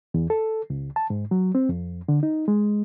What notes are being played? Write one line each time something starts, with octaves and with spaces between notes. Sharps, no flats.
E2
A4
C#2
A5
G#2
F#3
C4
F2
D3
D#4
G#3